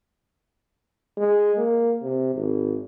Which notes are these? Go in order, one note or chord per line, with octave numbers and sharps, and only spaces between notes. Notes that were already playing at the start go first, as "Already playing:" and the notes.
G#3
A#3
C3
G#1